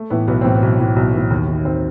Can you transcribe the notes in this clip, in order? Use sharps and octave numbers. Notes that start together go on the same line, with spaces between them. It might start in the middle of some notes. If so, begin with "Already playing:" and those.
Already playing: A3
A2 E3 B3
B1 B3
A2 E3 C4
B3
B1
A2 E3
B1
A2 E3
D#2
D#3
D#2 C4